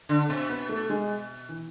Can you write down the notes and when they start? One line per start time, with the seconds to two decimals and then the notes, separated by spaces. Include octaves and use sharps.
0.09 D3 D4
0.29 B2 C4
0.49 B3
0.69 A3
0.90 G#3
1.49 E3